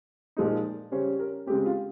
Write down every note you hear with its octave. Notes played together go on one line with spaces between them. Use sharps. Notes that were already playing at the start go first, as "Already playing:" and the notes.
A#2 F3 G#3 D#4
C#3 G3 C#4 C5
A#4
C#3 G#3 C4 G4
F4